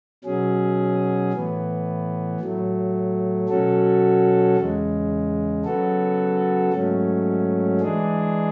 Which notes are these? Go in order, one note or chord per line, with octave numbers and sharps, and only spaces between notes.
B2 F#3 C#4 G#4
A2 E3 B3
A2 F#3 A3
B2 F#3 C#4 F#4 A4
E2 C#3 G#3
C#3 F#3 B3 F#4 A4
G#2 F#3 A3 C#4
E3 G#3 D4 G#4